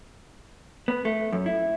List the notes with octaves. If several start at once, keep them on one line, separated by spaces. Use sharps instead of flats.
B3
A3
F#2
E4